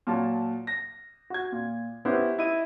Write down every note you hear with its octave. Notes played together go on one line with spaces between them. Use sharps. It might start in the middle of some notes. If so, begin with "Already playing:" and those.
A#2 F#3 A5
A#6
F#4 G#6
A#2
B3 C#4 E4 G4 B4 C5
E4 D#5 D#7